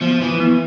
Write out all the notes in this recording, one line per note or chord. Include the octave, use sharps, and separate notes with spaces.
F3 B3
E3
B3